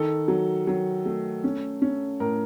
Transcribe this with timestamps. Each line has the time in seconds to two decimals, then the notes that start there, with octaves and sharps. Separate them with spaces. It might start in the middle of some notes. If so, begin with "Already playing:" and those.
Already playing: D#3 A4
0.28 F#3
0.67 F#3
1.06 A3
1.44 C#4
1.82 C#4
2.20 A2 A#4